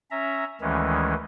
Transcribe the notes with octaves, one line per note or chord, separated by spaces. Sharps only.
C#4 E5 A#5
D2 D#3 E3 G#3 C#4